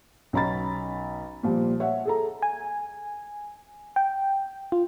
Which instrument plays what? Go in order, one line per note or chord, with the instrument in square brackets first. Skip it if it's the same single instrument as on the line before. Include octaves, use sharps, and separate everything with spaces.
[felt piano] B1 C#4 A#5 B5 A6
A#2 F3 G3
C#5 E5 F#5
G#4 A4 A#5
[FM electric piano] G#5
G5
F4